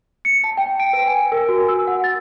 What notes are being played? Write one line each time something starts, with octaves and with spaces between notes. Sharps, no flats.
C#7
A5
G5
D7
B4
G#5
A#4
F#4
E6
F#5
A6